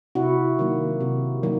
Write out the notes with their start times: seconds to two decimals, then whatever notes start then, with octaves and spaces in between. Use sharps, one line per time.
0.15 C3 E4 F#4
0.59 D#3 F#3 A#3
1.00 C3
1.43 D#3 F#3 A#3